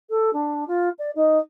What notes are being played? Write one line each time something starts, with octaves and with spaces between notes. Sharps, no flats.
A4
D4
F4
D5
D#4